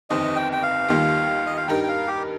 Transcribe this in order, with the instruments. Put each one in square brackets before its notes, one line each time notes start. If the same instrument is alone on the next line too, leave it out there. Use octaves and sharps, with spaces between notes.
[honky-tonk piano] G1 F2 D#3 C4 D#4 [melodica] D#5
[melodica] G5
G5
F5
[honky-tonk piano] D#2 D#3 G3 A#3 F4
[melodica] D#5
F5
[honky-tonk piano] G2 G3 D#4 A#4 [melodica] G5
[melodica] G5
F5
G4